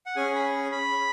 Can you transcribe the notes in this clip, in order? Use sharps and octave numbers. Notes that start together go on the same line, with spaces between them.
F#5
C#4 G#4 G#5
B5
B5